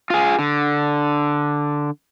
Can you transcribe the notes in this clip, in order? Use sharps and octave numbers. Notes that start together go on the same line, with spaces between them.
F4 G#4
D3